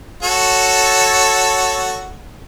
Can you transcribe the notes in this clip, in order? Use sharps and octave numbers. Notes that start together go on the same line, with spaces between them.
F#4 A4 C#5